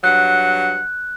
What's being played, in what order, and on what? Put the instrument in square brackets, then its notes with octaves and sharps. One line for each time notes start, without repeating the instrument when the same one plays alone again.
[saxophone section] G2 F#3 F#5 [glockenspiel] F#6